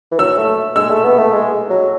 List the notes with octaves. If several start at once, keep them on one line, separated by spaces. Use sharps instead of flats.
E3
F#3 E6
A3
G#3 E6
A3
B3
A3
G#3
F#3